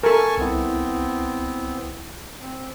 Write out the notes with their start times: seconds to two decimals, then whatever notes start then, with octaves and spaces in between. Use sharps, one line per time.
0.03 A4 A#4 G#5 A5 C#6
0.38 C2 B3 C4 E4
2.41 C4